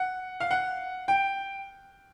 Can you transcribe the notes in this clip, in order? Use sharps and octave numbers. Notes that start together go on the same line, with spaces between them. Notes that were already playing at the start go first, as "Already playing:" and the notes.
Already playing: F#5
F5
F#5
G5